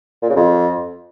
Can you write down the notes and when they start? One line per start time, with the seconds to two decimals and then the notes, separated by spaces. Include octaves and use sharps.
0.22 A#2
0.29 C#3
0.36 F2